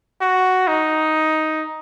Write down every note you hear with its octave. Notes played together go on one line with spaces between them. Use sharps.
F#4
D#4